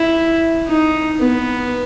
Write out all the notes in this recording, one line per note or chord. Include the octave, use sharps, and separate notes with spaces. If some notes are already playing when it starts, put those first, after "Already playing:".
Already playing: E4
D#4
B3